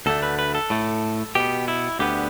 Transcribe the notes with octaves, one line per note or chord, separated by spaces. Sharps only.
D2 D3 A3 A4
B4
B4
A4
A2 A3
B2 B3 G4
E4
D2 D3 B3 G4